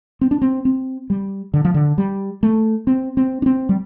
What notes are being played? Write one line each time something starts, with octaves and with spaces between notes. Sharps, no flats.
C4
D4
C4
C4
G3
D3
F3
D3
G3
A3
C4
C4
D4
C4
G3